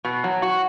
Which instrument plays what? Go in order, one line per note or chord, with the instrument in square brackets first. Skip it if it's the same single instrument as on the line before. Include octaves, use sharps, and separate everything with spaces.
[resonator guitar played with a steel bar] B2
F#3
F#4